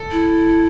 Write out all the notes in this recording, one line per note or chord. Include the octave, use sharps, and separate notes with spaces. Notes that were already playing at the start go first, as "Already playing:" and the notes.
Already playing: A4
E4